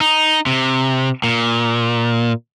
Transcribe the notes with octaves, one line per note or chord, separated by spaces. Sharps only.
D#4
C3
A#2